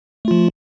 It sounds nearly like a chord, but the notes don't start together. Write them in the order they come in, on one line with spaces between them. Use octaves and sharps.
A3 F4 F3